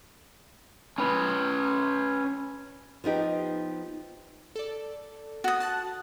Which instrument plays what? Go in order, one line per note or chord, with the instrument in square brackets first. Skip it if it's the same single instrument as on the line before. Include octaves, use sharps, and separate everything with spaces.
[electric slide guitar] C#4 B4
[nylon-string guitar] F3 B3 D#4 G4
[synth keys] A4 D5
[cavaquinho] F#4 D#6
[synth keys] A5 F#6 A6